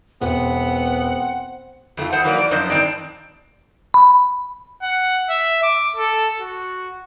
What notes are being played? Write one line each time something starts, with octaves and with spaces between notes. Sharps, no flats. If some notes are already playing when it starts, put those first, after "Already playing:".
E1 B3 C4 F#5
F2 A3 D4 F4
E2 A3 C5 F#5
E3 F#3 A#3 D5
D5
F#2 F3 D4 C5 D#5
G2 D#3 A#3 C4 D5
B5
F#5
E5
D6
A4
F#4